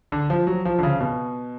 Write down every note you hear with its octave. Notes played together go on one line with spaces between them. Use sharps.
D3
F3
F#3
F3
D3
C#3
B2